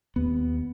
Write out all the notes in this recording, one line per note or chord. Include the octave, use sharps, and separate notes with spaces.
D#2 B3